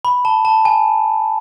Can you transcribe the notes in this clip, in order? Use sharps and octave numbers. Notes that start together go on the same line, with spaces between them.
B5
A5
A5
G#5